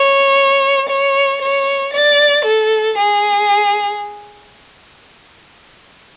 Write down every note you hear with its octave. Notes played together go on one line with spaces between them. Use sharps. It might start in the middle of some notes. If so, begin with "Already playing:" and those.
Already playing: C#5
C#5
C#5
D5
A4
G#4